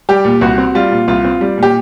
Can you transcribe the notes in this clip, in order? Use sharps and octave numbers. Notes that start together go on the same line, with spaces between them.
G3 G4
A#2
C2 F#4
C4
G3 F4
A#2
C2 F4
C4
G3
A#2 G4